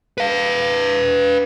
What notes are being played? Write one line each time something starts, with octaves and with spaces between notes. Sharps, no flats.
B4 F5